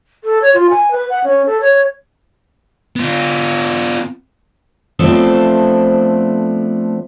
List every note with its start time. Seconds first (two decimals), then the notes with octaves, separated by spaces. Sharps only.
0.24 A4
0.42 C#5
0.54 F4
0.70 G#5
0.91 B4
1.10 F#5
1.24 C#4
1.46 A4
1.60 C#5
2.96 B3 F4
4.99 F3 A3 B3 C4 D4